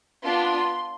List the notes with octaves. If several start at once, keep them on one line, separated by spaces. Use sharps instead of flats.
B3 D4 F4 C6